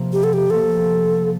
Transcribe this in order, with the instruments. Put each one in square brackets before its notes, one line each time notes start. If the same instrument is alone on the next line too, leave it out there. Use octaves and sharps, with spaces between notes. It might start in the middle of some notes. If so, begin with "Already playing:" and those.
Already playing: [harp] C3 F3 A#3
[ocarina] G4
A4
G4
[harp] C3 F3 A#3 [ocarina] A4